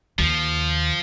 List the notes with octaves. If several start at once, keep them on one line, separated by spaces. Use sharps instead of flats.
D#2 F3